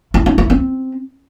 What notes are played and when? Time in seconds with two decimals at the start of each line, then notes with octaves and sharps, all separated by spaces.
0.14 E4
0.26 D#4
0.38 E4
0.50 C4